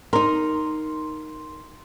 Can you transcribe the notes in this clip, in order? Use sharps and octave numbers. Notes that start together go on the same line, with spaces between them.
D#4 A#4 C6